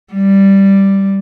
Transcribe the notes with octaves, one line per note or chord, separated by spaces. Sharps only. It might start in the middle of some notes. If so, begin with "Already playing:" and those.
G3